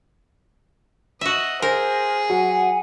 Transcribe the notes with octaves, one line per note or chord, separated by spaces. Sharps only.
F#4 D#5 E5
G#4 A#4 C5
F#3 F#5 G#5